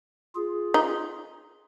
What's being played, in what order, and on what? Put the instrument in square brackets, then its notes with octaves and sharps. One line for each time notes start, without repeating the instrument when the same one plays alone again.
[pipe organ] F4 G#4
[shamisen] D#4